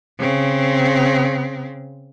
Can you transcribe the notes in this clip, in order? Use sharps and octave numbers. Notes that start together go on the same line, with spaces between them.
C#3 C4